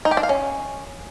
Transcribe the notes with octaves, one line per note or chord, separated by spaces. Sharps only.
D#4
G4
D4
F5
C#4